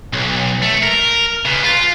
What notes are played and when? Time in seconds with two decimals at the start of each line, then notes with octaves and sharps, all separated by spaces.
0.13 B1
0.62 A3
0.83 A#4
1.45 C#3 B3
1.63 F4